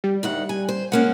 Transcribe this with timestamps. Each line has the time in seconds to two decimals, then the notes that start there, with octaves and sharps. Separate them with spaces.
0.04 G3
0.23 D2 D#3 F#5
0.49 G#5
0.69 C5
0.92 G#3 A#3 C#4 F#5